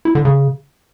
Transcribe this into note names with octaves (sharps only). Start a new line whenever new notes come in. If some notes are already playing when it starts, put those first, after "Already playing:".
E4
D3
C#3